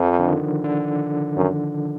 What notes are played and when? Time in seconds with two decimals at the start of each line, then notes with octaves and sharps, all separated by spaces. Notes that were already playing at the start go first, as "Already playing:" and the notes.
Already playing: F2 F3
0.19 D3
0.28 D#3
0.64 D3
1.37 F#2